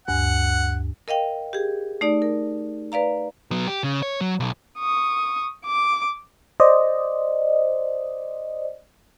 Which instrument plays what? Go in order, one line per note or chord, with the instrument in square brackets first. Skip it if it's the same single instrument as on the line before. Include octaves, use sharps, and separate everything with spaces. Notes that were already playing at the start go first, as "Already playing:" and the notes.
[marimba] D2 G2 G#5 [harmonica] F#5
[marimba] A#4 D#5 F5 G5
G4 G#4
A3 D#4 D5
A#4
B4 D5 F5 A#5
[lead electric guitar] F#3 B3
G4
C#3
C#5
F#3
B1
[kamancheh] C#6 D#6
D6
[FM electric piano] C5 D5 D#5